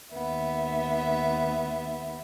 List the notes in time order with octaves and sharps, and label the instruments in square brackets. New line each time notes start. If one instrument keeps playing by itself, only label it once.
[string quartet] D#2 B3 E5